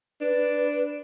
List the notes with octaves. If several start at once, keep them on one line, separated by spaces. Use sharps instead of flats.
D4 B4